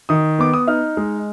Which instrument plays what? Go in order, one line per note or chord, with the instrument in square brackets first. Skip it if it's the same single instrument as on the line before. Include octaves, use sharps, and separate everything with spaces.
[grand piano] D#3 D#6
B3 D6
D#6
D#4 F6
G#3